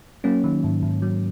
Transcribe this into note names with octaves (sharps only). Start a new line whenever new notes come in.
F#3 A#3 C#4
D#3
G#2
G#2
F#3